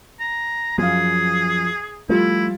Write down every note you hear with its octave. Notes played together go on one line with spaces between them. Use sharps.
A#5
F#2 F3 G#4 F5
F3 G3 A3 E4 F4